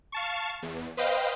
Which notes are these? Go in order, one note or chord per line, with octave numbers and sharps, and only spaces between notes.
F5 A5 C#6
E2
B4 C5 D#5 F5 G5